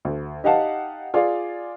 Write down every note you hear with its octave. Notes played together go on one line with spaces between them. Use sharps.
D2
D#4 G4 D#5 F5 F#5 A5
F4 G#4 D5 F5